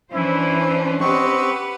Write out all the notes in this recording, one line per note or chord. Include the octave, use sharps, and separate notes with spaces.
E3 C#4 D4 E4 C5
C4 G4 B4 D#5 F#5 C#6